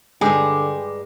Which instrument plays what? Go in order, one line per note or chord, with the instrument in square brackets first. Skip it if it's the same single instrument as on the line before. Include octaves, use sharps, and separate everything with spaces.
[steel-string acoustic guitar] G2 G#3 [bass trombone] D3 [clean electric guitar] G4 [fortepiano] G#5